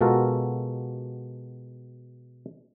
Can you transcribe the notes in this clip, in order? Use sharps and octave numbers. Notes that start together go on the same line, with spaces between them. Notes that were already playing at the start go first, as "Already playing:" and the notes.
B2 G#3 F4 F#4 A4 A#4